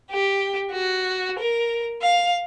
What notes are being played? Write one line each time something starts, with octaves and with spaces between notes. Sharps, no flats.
G4
F#4
A#4
F5